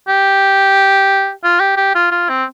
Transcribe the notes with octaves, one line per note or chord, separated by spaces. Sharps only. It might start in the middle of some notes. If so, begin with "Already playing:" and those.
G4
F4
G4
G4
F4
F4
C4